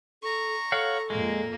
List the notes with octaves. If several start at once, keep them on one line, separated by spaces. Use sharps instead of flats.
A4 A#5 C#6
A4 C#5 F5 F#5
F2 A#2 G#3 A#3